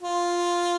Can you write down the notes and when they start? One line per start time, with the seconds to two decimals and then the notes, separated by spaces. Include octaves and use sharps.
0.01 F4